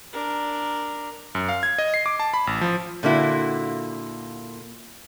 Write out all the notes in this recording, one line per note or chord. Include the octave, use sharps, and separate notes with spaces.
D4 A#4
F#2
F5
G#6
D#5
C7
D6
A5
B5
A1
F3
A#2 D3 A#3 E4 F#4